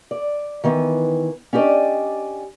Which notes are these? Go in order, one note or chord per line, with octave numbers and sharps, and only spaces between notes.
D5
D#3 E3 B3
C#4 D4 G4 B4 D5 D#5